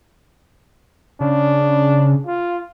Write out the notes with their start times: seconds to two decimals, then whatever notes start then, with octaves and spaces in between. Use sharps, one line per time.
1.20 C#3 D4
2.27 F4